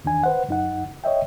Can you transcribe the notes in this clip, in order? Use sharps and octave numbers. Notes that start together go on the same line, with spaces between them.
E2 D#3 D4 G#5
B4 C5 F#5
F#2 D#4 F#5
C#5 D#5 E5 G5